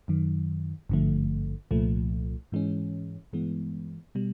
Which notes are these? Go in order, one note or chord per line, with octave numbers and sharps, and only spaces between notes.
F#2 D#3 F#3
G#1 G2 D3 F3 A3
C2 A#2 F3 A3
G#2 E3 G#3 C#4
G2 E3 G#3 B3
B2 G3